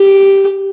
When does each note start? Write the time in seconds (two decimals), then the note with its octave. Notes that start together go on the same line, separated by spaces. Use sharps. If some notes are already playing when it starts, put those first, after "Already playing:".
Already playing: G4